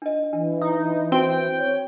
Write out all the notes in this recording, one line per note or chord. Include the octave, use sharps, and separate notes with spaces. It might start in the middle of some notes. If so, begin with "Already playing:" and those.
D4 D#5
E3 D4
D#4
C4 F#4 G5
C#5